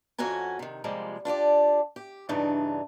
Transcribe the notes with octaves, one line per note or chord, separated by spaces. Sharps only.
F2 C#4 F#4 G#5 A#5
C3 D#3
C3 F3 G3 G#3 A#3
D4 F4 G4 D5
G4
G2 C#3 E3 D4 D#4